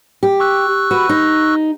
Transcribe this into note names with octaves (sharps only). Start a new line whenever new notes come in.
G4
C#6 E6 F#6
F#4 B4
D#4